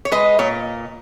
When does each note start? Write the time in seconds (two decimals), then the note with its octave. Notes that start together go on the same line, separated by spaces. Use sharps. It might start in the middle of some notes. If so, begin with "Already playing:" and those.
0.05 C#5
0.12 G#3 B4 D#5
0.39 A#2 C#5